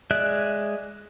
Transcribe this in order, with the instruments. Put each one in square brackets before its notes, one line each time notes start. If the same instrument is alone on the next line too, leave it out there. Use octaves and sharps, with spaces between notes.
[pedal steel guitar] G#3 D5 E5 F#6